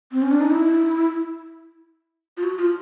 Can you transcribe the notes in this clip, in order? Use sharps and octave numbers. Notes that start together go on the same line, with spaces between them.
C4
C#4
D4
D#4
E4
F4
F#4
F4